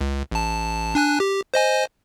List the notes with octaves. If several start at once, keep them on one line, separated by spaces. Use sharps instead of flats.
C#2
A1 A5
D4 G#5 F#6
G4
C5 D#5 G#5